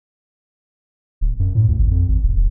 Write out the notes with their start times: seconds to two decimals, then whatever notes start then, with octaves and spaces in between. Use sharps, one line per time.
1.21 D1
1.40 F#2
1.55 A2
1.68 D2
1.79 G#1
1.91 F2
2.08 G#1
2.23 D1
2.36 D#1